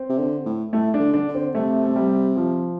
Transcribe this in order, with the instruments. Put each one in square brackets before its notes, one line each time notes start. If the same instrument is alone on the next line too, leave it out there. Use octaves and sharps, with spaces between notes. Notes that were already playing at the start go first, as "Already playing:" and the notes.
Already playing: [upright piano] C4
[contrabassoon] C3
D3
A2
[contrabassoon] A2 [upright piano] A3
[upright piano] D4
[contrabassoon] D3
[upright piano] D4
[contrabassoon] D3
[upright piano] C4
[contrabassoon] C3 [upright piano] A3
[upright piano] A3
G3
F3